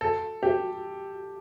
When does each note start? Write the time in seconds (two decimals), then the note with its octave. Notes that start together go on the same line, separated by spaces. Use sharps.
0.01 A4
0.43 G4